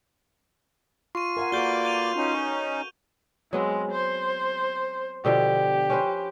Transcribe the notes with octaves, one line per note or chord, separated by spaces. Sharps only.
F4 C6 C#6 D#7
A#4 F5 F#5 G#5
A#3 F#4 A4 B4 D5 C#6 G6 G7
G6 D#7 F7
C#4 D#4
F#3 G#3 B3 C4
C5
B2 D3 F3 G4
C#4 B4 C5